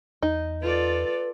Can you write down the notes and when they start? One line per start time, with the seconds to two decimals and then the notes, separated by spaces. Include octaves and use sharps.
0.23 E2 D#4
0.62 F4 A4 B4 D5